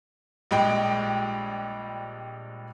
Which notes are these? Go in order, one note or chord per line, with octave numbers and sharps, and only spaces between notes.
A#1 G3 G#3 G5